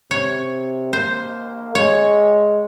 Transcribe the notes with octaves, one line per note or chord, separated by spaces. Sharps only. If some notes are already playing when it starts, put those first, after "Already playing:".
C3 C#5
A#3 C5
G#3 C#5